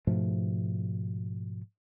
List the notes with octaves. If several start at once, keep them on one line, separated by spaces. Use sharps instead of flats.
G#2 B2 F3 A3